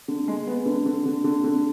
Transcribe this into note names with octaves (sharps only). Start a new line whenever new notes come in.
D3
G#3
B3
D3
D3
D3
D3
D3